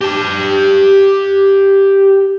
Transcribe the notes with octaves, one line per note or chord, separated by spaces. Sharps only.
G4 A5